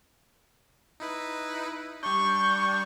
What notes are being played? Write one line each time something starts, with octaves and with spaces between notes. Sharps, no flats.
D#4 E4 B4
G3 D4 C#6 G6